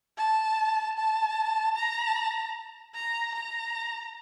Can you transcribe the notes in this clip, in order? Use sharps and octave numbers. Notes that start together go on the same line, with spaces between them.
A5
A5
A#5
A#5
A#5